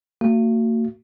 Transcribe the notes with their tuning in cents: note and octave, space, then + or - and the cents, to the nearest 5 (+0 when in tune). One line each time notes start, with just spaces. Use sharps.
A#3 -45 F#4 +5